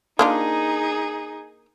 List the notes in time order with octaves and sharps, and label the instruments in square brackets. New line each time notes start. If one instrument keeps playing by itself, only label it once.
[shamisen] A#3 D4 F4 [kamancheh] D#4 G#4